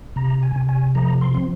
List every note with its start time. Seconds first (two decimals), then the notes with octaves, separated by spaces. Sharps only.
0.16 C3 A#5
0.43 G#5
0.56 C3
0.69 G#5
0.95 F3 A#5
1.21 C6
1.34 C4